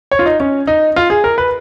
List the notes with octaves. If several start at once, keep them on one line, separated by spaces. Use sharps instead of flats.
C#5
F4
D#4
C#4
D#4
F4
G#4
A#4
B4